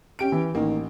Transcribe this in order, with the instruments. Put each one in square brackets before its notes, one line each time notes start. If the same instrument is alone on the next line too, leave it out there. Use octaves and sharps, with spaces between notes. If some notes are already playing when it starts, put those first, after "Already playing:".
[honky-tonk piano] C#4 G4 D7
[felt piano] E3
[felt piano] A1 [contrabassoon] D#3 [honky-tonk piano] A#3